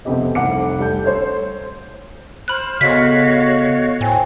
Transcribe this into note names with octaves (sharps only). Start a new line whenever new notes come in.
F2 C3 B3 C4 G4 D#5
F1 C2 F#5 D6 C#7
G3 A3 G6
A4 C5 C#5 G6
C5 B5 F6 F#6
C#3 B3 F#4 A4 C#5 D#5 F5 B6
A2 C5 G5 G#5